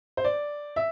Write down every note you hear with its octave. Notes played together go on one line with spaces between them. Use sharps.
C5
D5
E5